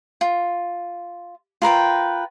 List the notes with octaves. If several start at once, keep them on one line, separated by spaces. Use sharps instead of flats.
F4
F4 A#4 B4 G5